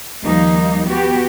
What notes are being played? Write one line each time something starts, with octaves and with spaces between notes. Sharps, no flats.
D#2 F3 G3 A#3 D#4
B3 F#4 G4